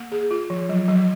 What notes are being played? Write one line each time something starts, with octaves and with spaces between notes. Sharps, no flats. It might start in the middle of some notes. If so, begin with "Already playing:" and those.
Already playing: A#3
G#4
F4
F3
F#3
F#3